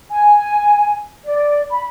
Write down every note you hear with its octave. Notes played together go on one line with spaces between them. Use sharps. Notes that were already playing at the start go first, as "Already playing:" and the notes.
G#5
D5
B5